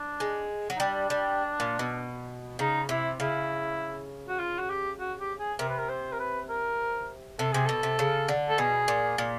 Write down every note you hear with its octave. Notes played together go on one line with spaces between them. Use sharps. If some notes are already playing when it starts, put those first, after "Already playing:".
Already playing: D4
G#3
F#3
D#4
G3 D4
G3
A#2
B2
C#3 D#4
C3 E4
C#3 E4
F#4
F4
F#4
G4
F#4
G4
G#4
C3 A#4
B4
A#4
C5
A#4
B4
A#4
C3 A4
C3 G#4
B2 A4
C3
C#3
D3
A4
B2 G#4
A#2
A#2